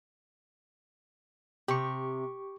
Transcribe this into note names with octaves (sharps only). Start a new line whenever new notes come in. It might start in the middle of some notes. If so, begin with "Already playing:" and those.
C3 G4 C#6